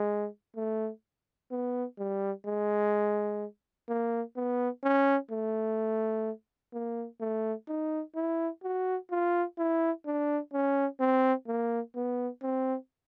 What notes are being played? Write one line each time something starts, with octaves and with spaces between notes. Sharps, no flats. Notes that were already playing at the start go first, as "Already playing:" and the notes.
Already playing: G#3
A3
B3
G3
G#3
A#3
B3
C#4
A3
A#3
A3
D#4
E4
F#4
F4
E4
D4
C#4
C4
A#3
B3
C4